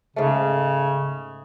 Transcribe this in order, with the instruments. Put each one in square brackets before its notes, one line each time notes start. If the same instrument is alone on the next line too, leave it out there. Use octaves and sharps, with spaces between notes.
[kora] G#2 A3 [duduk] C#3